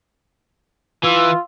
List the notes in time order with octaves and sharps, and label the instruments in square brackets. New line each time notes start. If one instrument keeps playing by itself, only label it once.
[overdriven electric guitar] E3 [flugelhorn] F4 [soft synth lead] E6